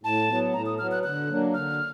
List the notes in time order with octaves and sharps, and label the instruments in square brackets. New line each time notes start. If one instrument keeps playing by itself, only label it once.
[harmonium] A2 [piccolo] A5
[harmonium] F#3 B3
[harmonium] A2 [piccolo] A#5
[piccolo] D#6
[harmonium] F#3 B3 [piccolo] F6
[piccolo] F#6
[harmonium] D3 [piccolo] F#6
[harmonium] F#3 A#3 D4
[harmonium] D3 [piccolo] F6